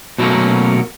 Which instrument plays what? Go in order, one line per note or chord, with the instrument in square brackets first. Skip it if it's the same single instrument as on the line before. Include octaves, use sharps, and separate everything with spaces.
[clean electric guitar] B2 F#3 G3 A3 A#3 C#4